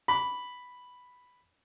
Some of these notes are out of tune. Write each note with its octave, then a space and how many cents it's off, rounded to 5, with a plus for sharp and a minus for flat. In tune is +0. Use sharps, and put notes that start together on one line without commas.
B5 +0 D6 -20